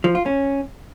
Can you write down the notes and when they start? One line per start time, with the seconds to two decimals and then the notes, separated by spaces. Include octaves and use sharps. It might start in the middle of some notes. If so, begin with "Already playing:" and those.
0.04 F3
0.15 F4
0.26 C#4